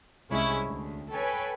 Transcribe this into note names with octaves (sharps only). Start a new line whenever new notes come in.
C2 G#3 C#4 E4 C#5
D2
A4 B4 C#5 G5 G#5 B5